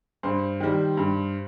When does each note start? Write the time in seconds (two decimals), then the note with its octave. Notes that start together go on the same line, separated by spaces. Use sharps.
0.23 G2 C5
0.60 D#3 G3
0.97 G2